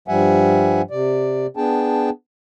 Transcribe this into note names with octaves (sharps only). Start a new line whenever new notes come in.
G2 F3 G3 E5 F#5 G#5
C3 D5
B3 D4 G#4 G5 A5